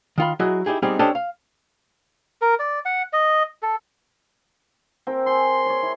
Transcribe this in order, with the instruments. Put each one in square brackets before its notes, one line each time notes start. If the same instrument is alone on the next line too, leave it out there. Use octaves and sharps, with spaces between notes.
[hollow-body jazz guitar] D#3 F4 B5
F#3 E4 F#4 G#4 D#5
D#4 E4 G4 G#4
G3 B3 C4 D#4 G4 G#4
C#4 D4 G4 A4 C5 D#5
F5
[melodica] A#4
D5
F#5
D#5
A4
[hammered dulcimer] C4 A#4 G5
[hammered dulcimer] G#4 [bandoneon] C6
[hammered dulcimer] C#5 D5
E4